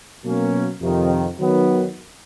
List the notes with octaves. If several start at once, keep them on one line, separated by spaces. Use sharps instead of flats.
B2 F#3 A#3 C#4
F2 C3 D#3
D#3 F#3 B3